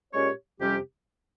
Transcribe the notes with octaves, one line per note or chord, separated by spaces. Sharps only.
A#2 G#3 C#4 G4 C#5
F2 C3 G3 C#4 G4